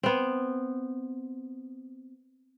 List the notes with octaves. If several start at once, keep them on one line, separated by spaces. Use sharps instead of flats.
B3 C4